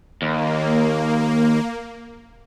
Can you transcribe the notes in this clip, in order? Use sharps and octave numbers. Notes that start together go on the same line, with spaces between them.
D#2 A#3